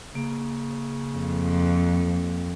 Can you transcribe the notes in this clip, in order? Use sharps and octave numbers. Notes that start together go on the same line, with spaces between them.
C#3 A#3
F2